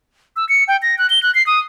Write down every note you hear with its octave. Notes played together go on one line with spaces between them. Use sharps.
E6
C#7
G5
A#6
F#6
G7
F#6
C7
D#6